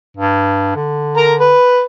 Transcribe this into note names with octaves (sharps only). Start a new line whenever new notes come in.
G2
D3
A#4 A#5
B4